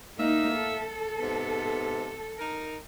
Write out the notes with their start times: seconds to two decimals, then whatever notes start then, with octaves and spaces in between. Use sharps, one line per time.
0.18 A2 A#3 D#4 E5 F5
0.55 A4
1.20 G#2 C3 B3
2.39 D#4 A#4